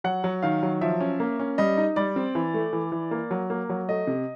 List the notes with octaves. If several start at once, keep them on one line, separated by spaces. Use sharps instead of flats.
F#3 F#5
F#3
D#3 F5
F#3
F3 E5
C#4
A#3
C#4
G3 D#5
D#4
G3 D5
C4
E3
A3
E3
E3
A#3
F#3
A#3
F#3
A3 D#5
C3